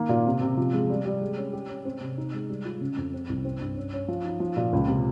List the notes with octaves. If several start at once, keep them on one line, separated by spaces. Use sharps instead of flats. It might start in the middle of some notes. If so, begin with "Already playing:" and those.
Already playing: D#3 A#3
A#2
C3
C3
F3
G#3
G3
G3
G#3
C#4
G4
C#4
C4
C3
D#4
G#3
G3
F4
C#3
F2
C4
C2
C4
G2
C#4
C#4
F3
D#4
F3
A#2
C#2
C3